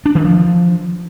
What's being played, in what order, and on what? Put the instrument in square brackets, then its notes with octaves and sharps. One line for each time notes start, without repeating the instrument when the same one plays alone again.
[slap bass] D4
D#3
F3